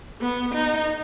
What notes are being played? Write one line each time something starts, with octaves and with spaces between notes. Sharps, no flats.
B3
D#4